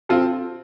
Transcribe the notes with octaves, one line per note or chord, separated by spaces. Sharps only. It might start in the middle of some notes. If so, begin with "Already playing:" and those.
C4 F4 A4